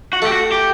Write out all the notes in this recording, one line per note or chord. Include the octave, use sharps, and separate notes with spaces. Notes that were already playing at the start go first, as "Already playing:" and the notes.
F#4
A3 G4
F#4
G4